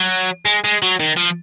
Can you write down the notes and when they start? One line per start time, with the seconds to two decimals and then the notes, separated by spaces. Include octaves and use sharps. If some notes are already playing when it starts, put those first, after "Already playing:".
Already playing: F#3
0.45 G#3
0.64 G#3
0.82 F#3
1.00 D#3
1.17 F3